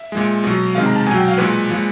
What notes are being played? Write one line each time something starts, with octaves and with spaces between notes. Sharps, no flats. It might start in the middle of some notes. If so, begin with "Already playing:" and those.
Already playing: E5
A#2 F3 G#3
B2 F#3
C3 D#3 G#3 F5
A#5
A5
B2 F#3 G#5
G5
F5
A#2 F3 G#3 B4
A#2 F3 G#3